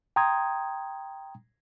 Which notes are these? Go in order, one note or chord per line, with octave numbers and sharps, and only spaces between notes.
G5 A#5 C6 D#6 G#6